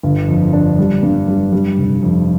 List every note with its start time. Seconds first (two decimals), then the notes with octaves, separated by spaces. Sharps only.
0.03 G1
0.28 F2
0.53 D4
0.79 G3
1.03 G2
1.28 G3
1.53 G3
1.78 F1
2.02 F2